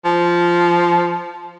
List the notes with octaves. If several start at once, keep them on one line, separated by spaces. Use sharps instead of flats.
F3